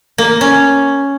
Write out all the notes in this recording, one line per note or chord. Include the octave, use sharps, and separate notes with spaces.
A#3
C#4